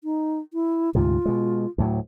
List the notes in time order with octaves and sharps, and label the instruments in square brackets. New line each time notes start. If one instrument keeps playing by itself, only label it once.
[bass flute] D#4
E4
[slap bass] D2 G#2 C3 [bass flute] F4
[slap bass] B2 G#3
D2 A2 F#3